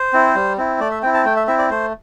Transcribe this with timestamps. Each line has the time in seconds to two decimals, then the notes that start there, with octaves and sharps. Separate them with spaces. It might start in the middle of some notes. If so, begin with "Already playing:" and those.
Already playing: C5
0.13 C4 E4
0.35 G3
0.57 C4 E4
0.80 A3 D5
0.91 E5
1.02 C4 E4 G5
1.14 A5
1.25 A3 G5
1.36 E5
1.47 C4 E4 E5
1.58 D5
1.70 A3 C5